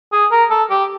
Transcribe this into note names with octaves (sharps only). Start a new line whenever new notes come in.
G#4
A#4
A4
G4